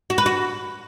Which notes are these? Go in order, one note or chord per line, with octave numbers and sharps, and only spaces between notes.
F#4
B4
F#4